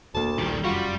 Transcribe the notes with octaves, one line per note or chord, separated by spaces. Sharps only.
E1 D2 A#3 A5
A#1 D#2 D#3 G3
F1 F#2 G3 F4 F#4